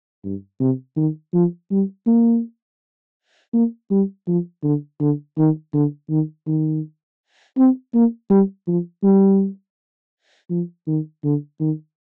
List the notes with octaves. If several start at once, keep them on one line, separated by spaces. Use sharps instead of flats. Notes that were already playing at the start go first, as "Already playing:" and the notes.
G2
C3
D#3
F3
G3
A#3
A#3
G3
F3
D3
D3
D#3
D3
D#3
D#3
C4
A#3
G3
F3
G3
F3
D#3
D3
D#3